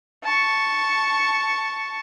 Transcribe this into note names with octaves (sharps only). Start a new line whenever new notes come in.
A5 C#6